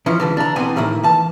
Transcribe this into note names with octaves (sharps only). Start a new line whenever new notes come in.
E3 F3 C#4 E4
C#2 D3 E3
D4 A#5
B1 E3 B3 C4 G#5
A2 D#3 A#3 E4
E3 A5